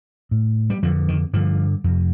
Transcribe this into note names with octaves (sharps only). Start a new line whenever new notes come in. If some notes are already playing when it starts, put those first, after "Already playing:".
A2
G3
F2 D3 F3
D#3
G2 D3 F3
F2 C3